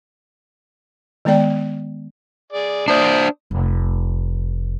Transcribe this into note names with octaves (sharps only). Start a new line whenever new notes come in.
D#3 G#3 B3 D5 G5
G#4 D5
D4 C5 D5 D#6
F1